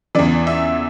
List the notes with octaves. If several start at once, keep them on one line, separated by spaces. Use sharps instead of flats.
E2 C#3 E3 D5
E5